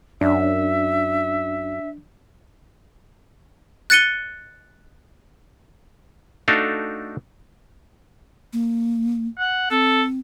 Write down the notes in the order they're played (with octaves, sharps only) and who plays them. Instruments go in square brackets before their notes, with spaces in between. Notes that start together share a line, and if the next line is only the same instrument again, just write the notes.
[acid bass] F#2 [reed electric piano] D4 [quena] E5
[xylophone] F#6 A6 C#7 D#7 G7
[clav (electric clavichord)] A3 D4 D#4 F#4 A4 F5
[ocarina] A#3
[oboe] F#5
[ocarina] C4 [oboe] A4